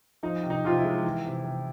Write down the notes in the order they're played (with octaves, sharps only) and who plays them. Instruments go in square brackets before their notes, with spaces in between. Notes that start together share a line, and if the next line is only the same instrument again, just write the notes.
[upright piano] F3 D#4
C3
D#4
C3 F4
E4
G#3
E3
C3
C3